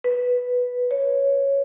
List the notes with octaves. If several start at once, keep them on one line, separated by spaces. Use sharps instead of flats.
B4
C#5